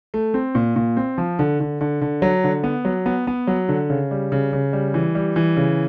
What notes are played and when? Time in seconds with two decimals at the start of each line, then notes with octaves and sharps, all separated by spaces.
0.14 A3
0.34 C4
0.55 A#2
0.76 A#2
0.97 C4
1.18 F3
1.39 D3
1.60 D3
1.81 D3
2.01 D3
2.22 F#3
2.44 D3
2.64 B3
2.85 F#3
3.06 B3
3.27 B3
3.47 F#3
3.69 D3
3.90 C#3
4.11 G3
4.32 C#3
4.53 C#3
4.73 G3
4.94 E3
5.15 G3
5.36 E3
5.57 C#3